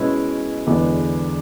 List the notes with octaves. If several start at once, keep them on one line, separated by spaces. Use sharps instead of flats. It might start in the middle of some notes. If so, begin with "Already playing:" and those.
Already playing: B2 G#3 C#4 E4 B4
E2 D3 G#3 B3